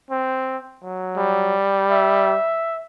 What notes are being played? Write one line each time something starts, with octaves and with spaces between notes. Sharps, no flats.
C4
F#3
G3
E5